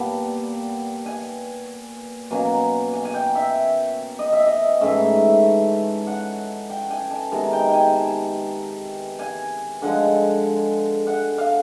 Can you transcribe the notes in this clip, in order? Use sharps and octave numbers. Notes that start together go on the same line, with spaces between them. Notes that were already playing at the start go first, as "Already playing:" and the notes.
Already playing: A#2 G3 B3 A5
G#5
B2 F#3 A#3 C#4 G#5
G#5
G#5
G5
E5
D#5
E5
D#5
G#2 E3 A3 C#4 E5
F#5
G5
G#5
A5
C3 D#3 G#3 B3 G#5
G5
G5 G#5
A5
G#5
D3 F3 G#3 F#5
F#5
F5